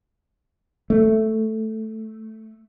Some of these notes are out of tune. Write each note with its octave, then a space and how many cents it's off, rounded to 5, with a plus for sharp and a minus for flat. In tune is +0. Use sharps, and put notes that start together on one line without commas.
A3 +0